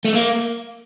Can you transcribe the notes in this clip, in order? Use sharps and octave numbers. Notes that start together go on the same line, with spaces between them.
A3
A#3